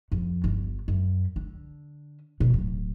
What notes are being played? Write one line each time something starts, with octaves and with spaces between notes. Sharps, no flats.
F2
G1
F#2
D3
B2
D1